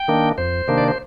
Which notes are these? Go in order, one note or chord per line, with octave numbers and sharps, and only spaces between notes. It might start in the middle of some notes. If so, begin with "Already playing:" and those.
Already playing: G5
D#3 A#3 D4
F2 C5
C3 D#3 A#3 D4
D5
C5